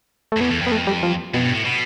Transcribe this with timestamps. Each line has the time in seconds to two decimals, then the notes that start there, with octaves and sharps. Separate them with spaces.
0.32 A3
0.37 F2
0.41 E2 B3
0.51 E2
0.61 F2
0.67 B3
0.72 A3
0.87 G3
1.03 F3
1.34 F2 B2
1.44 G2
1.54 A2
1.64 B2